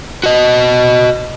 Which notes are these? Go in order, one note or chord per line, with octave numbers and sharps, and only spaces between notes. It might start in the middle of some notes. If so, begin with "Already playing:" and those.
F#4 D#5